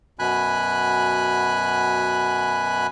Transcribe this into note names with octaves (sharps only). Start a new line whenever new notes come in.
F#2 B2 G#5 B5 F#6